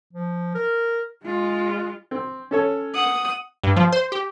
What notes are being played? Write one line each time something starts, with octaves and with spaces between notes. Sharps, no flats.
F3
A#4
G#3 F4
C4
C#4 A4 C#5
F#5 D#6
G2
F3
C5
G4